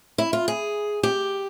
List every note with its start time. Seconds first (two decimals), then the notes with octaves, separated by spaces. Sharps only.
0.18 E4
0.33 F4
0.48 G#4
1.03 G4